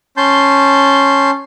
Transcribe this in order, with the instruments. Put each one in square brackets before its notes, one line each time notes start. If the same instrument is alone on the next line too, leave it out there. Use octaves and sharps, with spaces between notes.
[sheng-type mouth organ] C#4 A5 C6 G6